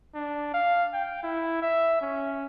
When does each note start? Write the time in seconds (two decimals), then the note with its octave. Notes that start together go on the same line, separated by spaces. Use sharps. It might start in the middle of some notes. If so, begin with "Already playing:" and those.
0.15 D4
0.54 F5
0.93 G5
1.23 E4
1.62 E5
2.01 C#4